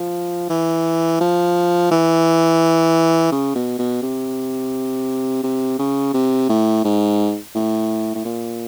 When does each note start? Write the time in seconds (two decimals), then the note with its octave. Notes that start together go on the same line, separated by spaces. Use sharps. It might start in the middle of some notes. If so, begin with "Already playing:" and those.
Already playing: F3
0.50 E3
1.20 F3
1.91 E3
3.31 C#3
3.55 B2
3.79 B2
4.02 C3
5.43 C3
5.79 C#3
6.14 C3
6.49 A2
6.84 G#2
7.55 A2
8.15 A2
8.25 A#2